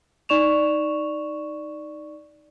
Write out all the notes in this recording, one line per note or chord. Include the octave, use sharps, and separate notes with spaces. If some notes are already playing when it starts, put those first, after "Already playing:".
D#4 D5 C#6 E7 F7